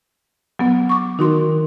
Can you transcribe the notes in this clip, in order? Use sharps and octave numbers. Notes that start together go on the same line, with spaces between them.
F#3 B3
C#6 D6
D#3 D#4 F#4 C6